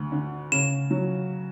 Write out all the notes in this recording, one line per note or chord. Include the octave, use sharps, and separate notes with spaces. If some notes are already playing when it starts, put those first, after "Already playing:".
Already playing: D2
D3
C#3 E7
F#3